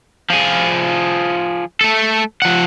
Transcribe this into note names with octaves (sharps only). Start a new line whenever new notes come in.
F3 G#4
A3 A4
F3 F#5